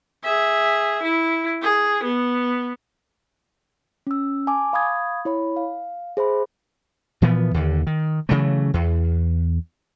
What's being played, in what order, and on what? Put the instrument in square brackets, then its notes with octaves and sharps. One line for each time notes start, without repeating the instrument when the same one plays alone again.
[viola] G#4 E5
E4
G#4
B3
[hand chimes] C#4 E6
G#5 A5 D6
F5 B5 C#6 D#6 G#6
E4 C#5 B5
F5
G#4 C5 E5 B5
[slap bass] A#2 E3 F3 B3
D#2 D3
D#3
C#3 E3 F#3 A3
E2